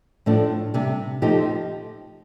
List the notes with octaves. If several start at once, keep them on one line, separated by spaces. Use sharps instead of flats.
A2 F3 A3 D4
C3 G3 D4
F3 A3 D#4 G4